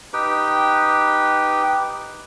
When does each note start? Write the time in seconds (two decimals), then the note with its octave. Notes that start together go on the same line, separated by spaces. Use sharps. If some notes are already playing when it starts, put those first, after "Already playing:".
0.13 D#4 G4 B4 G5